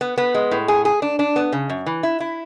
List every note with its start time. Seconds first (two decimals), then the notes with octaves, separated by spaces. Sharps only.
0.01 B3
0.18 B3
0.35 G#3
0.51 A2
0.68 G#4
0.85 G#4
1.02 D4
1.19 D4
1.36 B3
1.52 C#3
1.70 F#2
1.86 E3
2.03 E4
2.20 E4